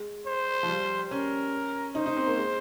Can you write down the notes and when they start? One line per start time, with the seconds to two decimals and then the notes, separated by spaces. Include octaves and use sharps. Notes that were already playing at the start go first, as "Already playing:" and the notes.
Already playing: G#3
0.27 C5
0.63 F3
0.69 G3
1.11 C#4 A#4
1.95 D#4 C5
2.06 D#4
2.17 C4
2.27 A#3
2.37 G#3